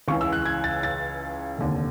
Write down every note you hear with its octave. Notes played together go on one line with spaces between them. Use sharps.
C#2 C#3 E3 C#6
E6
F#6
G#6
A6
A6
F1 D#2 D3